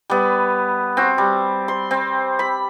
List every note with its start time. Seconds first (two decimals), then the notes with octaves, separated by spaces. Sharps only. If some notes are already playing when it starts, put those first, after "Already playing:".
0.10 G3 B3
0.97 C4 F#4
1.18 G3
1.68 C6
1.91 C4
2.39 B5